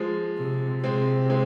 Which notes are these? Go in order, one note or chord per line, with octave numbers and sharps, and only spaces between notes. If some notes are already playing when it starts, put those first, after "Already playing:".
Already playing: F3 G#3
C3
C3 G#3 C4
G#3 C4